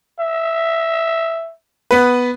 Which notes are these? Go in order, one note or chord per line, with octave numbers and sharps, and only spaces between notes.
E5
B3 B4